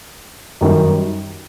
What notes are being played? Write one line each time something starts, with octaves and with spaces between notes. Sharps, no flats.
F#2 D#3 G3